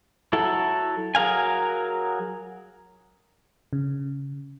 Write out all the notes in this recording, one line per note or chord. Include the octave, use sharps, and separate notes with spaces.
F#3 E4 A4
F#3 G#4 A#4 F5 G#5
C#3